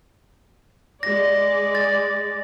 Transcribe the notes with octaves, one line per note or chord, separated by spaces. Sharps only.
G#3 D5 A#6
A6